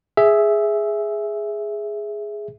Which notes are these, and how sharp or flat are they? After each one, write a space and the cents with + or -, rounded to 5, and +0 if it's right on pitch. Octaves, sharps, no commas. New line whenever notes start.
G#4 +0 E5 +0